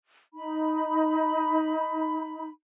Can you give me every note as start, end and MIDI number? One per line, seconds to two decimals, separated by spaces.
0.35 2.49 63
0.35 2.49 83